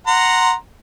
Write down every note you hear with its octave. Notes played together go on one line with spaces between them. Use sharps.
F#5 A#5 C6